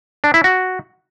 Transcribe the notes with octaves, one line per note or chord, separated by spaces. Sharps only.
D4
E4
F#4